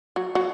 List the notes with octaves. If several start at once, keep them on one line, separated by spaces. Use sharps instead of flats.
F#3 F#4
F#3 F#4